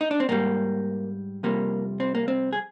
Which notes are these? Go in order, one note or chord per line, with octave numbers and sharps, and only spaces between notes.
D#4
D4
C4
G#2 G3 A#3
F2 C3 G3 A#3
C4
A#3
C4
G#4